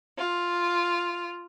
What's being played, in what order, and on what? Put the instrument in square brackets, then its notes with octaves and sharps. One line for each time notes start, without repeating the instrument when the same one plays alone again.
[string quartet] F4